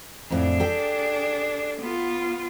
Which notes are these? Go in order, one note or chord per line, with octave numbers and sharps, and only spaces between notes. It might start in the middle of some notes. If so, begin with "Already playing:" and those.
F2 A2 D4 G#4
G4 A4 G5
B3 F4